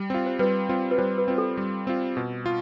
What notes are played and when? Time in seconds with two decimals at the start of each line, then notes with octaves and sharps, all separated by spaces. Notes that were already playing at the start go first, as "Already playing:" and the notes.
Already playing: G3
0.10 C4 F4
0.26 C5
0.39 G3 B4
0.69 C4 F4
0.91 B4
0.98 G3 C5
1.18 B4
1.28 C4 F4
1.38 A4
1.57 G3
1.87 C4 F4
2.17 B2
2.46 F4